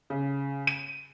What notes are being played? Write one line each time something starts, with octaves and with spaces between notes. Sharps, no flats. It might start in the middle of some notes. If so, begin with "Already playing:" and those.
C#3
D#7